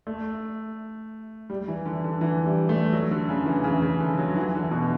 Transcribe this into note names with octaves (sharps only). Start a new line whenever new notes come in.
A3
G3
E3
D3
D3
E3
G3
A3
F#3
D3
C#3
E3
C#3
C#3
D3
F#3
E3
D3
B2